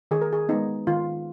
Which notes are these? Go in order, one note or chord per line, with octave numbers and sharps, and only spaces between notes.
D#3 G#4
A#4
G#4
G#3 B3 D#4
D#3 F4